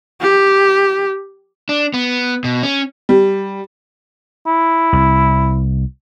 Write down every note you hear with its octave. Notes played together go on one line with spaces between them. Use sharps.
G4
D4
B3
B2
C#4
G3
E4
C2